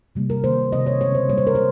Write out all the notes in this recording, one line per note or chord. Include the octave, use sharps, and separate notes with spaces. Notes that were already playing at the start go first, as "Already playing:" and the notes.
C3 G3 A#3
A#4
D#3 A#3 C5
C3 F3 C4 D#5
C#5
C#3 G#3 C4 C#5
C5
A#2 G3 A#3 C#5
C5
A#4
C5